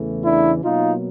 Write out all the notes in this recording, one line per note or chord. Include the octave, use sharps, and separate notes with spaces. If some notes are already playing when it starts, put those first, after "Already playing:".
Already playing: E2 C#3 E3 A3
D4 E4
B2 F#3 A#3 D#4 F4